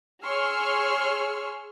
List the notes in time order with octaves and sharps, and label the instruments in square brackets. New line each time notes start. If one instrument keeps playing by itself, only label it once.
[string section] G#4 C#5 C6 C#6 E6 F6